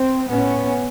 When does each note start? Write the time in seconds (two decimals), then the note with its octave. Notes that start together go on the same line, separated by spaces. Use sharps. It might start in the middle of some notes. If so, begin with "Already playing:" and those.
Already playing: C4
0.29 A2 B3 C#4